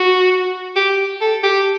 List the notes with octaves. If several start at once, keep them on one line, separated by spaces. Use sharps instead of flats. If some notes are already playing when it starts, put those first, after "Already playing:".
Already playing: F#4
G4
A4
G4